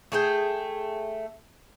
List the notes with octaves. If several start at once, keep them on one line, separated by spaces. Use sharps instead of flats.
A3 G#4 G5